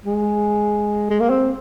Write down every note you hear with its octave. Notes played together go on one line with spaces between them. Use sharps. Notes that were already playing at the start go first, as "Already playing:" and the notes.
G#3
G#3
A#3
C4